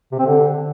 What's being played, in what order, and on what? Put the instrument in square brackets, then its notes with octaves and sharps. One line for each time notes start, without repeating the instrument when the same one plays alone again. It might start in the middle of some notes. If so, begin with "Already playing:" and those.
[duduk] C3
C4
D3